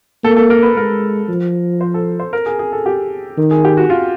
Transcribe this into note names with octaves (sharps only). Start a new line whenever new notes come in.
A#3 A4
A4
A#4
B4
G#3 A#4
F3
C5
A4
C5
A#4
G#4
G#4
A4
G4
D#3
G#4
G4
F#4
F4